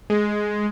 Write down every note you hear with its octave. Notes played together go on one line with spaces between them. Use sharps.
G#3